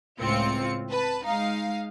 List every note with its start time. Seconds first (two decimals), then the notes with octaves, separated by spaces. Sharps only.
0.20 C#2 A2 C4 F4 C#7
0.91 B4 A5
1.25 G#3 D#4 F5